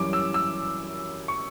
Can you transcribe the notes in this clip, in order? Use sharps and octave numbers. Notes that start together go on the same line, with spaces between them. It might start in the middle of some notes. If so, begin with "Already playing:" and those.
Already playing: F#2 E3 G3 C#4 D6
E6
E6
C#6